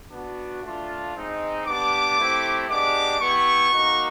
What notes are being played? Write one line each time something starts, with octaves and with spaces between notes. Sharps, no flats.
B3 D4 F#4
A3 D4 F4
G#3 C4 D#4
B3 D4 G4 D6
A3 C4 E4 G4
G#3 B3 D4 G4 D6
B3 E4 G4 C#6
A#3 D#4 F#4